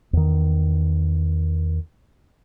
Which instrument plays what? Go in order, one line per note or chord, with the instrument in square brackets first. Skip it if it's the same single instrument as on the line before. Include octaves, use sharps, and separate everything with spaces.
[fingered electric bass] E2 D#3